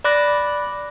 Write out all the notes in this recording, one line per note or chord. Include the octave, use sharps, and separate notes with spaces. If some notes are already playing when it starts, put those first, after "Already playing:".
D5 B5 D6 F#6 A#6